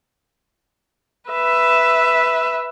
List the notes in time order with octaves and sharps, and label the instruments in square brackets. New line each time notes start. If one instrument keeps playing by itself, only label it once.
[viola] B4 E5